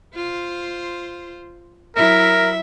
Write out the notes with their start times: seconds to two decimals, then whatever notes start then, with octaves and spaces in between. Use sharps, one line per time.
0.15 F4 C5
1.96 F#3 E4 A#4 E5